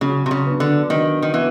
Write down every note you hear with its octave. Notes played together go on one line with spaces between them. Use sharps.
C#3 F#3
C3
C#3
B3 D4
D3
D#3 F#3
D#3
E3 B3